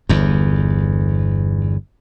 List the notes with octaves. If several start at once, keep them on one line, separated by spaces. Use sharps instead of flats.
G1 E2